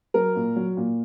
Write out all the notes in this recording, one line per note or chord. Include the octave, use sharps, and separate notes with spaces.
F#3 A#4
A#2
F#3
A#2